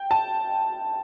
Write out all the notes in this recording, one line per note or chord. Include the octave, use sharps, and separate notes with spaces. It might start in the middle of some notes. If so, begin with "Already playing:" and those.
Already playing: G5
A5